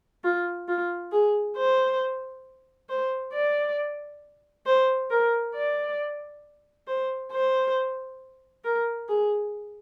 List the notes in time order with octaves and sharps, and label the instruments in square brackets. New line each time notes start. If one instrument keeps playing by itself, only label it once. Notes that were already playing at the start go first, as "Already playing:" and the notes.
[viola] F4
F4
G#4
C5
C5
D5
C5
A#4
D5
C5
C5
A#4
G#4